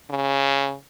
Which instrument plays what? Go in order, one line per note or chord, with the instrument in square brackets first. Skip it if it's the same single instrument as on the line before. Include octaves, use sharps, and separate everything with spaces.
[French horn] C#3